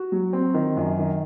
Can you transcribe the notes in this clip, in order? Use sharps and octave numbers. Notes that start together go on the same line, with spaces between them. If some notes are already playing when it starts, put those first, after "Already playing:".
Already playing: F#4
F#3
C4
D#3
F#2
D#3